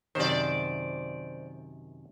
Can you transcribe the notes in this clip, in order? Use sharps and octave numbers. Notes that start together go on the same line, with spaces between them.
F#2 C3 D#3 C5 D5